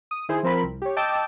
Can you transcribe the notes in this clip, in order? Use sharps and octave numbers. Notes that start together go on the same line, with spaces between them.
D#6
D#3 E4 G#4 C5
F3 C4 A#4 B5
C2
G4 C#5
D#5 G5 A5 D6 E6